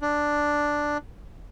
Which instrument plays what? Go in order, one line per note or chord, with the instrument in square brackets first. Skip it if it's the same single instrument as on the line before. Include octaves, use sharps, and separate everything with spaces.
[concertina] D4